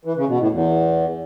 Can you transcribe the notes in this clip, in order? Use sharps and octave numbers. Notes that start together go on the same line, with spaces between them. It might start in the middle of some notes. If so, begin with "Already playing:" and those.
E3
C#3
B2
A2
E2